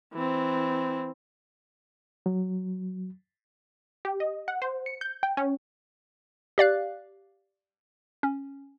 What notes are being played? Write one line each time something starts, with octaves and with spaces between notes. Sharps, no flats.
E3 C4
F#3
G4
D#5
F#5
C5
C#7
G6
G5
C#4
G4 D5 F5 F#6
C#4